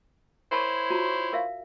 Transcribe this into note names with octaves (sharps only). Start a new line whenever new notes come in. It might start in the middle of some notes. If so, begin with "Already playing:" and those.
E4 A#4 C5 C#5 A5 B5
F4 F#4 A#5
A#4 E5 F5